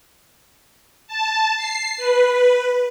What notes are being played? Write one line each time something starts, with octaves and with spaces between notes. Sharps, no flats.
A5
C7
B4